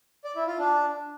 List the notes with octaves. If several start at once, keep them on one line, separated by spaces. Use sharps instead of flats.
D5
E4
F4
D4